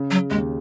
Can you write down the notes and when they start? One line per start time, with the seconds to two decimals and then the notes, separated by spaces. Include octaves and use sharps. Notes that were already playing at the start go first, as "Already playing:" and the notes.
Already playing: C#3
0.11 F#3
0.30 D#2 G#3